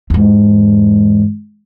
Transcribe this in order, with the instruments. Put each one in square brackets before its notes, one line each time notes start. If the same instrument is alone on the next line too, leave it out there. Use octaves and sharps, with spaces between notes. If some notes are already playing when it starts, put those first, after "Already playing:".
[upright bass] E2 G#2